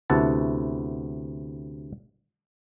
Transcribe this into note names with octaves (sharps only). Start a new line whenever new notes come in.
D2 C3 B3 E4 F#5 A5